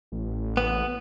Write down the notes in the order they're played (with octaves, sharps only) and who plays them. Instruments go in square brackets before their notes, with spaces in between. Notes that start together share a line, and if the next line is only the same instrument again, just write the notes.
[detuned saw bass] A1
[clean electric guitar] B3